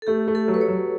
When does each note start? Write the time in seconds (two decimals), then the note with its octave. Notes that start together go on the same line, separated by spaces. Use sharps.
0.02 A4
0.07 A3 G4
0.28 A3
0.35 A4
0.48 F#3
0.54 B4
0.61 C#5
0.68 F#3